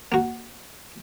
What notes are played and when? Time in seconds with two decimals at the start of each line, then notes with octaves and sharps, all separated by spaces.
0.12 A#3 F#4